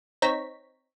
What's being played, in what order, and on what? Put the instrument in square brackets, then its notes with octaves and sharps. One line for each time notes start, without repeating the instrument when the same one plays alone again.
[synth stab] C4 D#4 C#5 A#5 B6